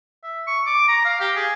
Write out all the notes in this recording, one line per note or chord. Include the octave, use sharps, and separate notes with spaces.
E5
C#6
D6
A#5
F5
G4
G#4